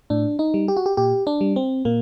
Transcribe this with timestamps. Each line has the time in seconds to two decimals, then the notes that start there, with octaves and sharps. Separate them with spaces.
0.10 A2 D4
0.39 D#4
0.54 G3
0.68 G4
0.77 F#4
0.86 G4
0.97 A#2 G4
1.27 D4
1.41 G3
1.56 C4
1.85 A#2 A#3